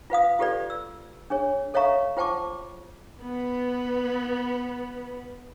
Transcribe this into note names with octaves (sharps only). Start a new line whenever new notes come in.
F4 B4 F5 D#6
F4 G4 A4 B4 D5
E6
D4 G#4 C#5
A4 C#5 E5 F5 A#5 C#6
F4 C5 G5 A5 C#6 D6
B3 B4